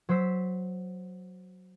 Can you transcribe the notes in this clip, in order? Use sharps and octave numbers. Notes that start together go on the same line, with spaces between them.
F#3 C5 E6 B6